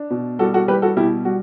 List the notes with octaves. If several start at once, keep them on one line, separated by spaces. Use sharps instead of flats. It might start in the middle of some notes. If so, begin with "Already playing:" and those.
Already playing: D4
B2
G3 F#4 A4
F#4 A4
G3 G4 B4
F#4 A4
B2 E4 G4
G3 F#4